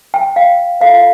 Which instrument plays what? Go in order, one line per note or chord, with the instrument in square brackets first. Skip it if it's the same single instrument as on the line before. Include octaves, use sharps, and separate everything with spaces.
[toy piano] G5
F5
F4 A4 C5 F5
F5